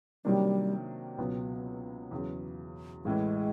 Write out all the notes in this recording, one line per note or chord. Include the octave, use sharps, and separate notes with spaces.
C3 D#3 F#3 G3 A#3 D4
C#2 B2 F#3 B3
E2 C#3 F#3
A1 A2 E3 G#3